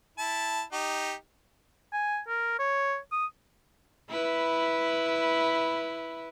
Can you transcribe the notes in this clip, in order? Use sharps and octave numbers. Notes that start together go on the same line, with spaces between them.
E4 A5
D#4 G4
G#5
A#4
C#5
D#6
E4 B4